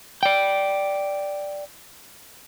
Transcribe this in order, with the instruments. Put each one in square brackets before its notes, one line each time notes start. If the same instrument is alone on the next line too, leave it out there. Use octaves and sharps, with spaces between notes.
[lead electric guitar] D5 G5